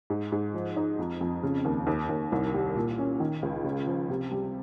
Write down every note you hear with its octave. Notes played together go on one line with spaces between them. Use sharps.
G#2
G#2
F3
D#4
F2
F2
C#3
D#2
D#2
D#2
C2
G3
A#2
C#4
D#3
C#2
C#3
F3
C3
G3